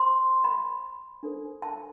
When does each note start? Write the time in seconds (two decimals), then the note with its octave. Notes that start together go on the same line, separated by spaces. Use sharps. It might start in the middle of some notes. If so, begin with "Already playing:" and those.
Already playing: C5 C6
0.44 B5
1.23 D4 A4 C5
1.62 A5